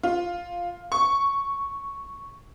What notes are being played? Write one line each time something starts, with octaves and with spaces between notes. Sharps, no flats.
F4
C#6